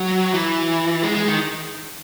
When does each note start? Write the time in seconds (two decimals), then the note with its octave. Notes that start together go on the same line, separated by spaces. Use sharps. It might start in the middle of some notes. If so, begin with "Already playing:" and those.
Already playing: F#3
0.34 E3
1.03 G#3
1.15 G#3
1.27 D#3